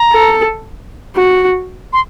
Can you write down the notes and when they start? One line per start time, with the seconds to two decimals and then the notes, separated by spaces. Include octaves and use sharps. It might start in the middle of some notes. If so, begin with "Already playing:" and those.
Already playing: A#5
0.13 A4
1.16 F#4
1.93 C6